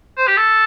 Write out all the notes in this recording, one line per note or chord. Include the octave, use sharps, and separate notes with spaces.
C5
G4
A4